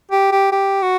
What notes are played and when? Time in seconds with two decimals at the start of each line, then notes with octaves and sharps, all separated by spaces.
0.11 G4
0.32 G4
0.52 G4
0.83 F#4